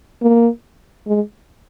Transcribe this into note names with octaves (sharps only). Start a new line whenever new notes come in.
A#3
G#3